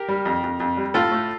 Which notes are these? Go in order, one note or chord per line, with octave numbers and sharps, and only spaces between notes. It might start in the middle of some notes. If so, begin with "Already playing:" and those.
Already playing: G4 A#4
G3
F2
F2
F2
G3
A2 F4 A4
A3